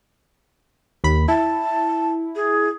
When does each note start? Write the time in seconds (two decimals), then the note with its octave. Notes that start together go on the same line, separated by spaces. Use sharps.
1.04 D#2 B5
1.28 E4 A5
2.36 G#4